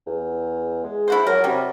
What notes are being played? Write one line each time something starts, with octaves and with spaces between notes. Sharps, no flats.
E2
G#3
E4 F#4 C5
F#3 A#4
C3 F#3 G3